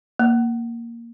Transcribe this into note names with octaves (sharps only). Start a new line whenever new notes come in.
A#3